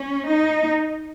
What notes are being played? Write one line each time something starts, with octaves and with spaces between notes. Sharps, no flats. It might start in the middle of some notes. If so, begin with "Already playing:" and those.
Already playing: C#4
D#4